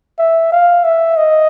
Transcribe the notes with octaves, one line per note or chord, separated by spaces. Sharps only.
E5
F5
E5
D#5